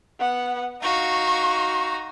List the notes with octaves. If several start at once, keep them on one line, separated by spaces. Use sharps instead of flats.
B3 F#5
D#4 F#4 F5 C#6